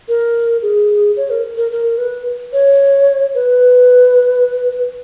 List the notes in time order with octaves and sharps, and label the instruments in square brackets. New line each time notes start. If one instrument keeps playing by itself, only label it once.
[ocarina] A#4
G#4
C#5
A#4
A#4
A#4
B4
C#5
B4